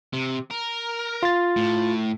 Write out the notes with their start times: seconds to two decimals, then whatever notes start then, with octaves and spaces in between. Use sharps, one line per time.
0.13 C3
0.51 A#4
1.23 F4 A6
1.56 A2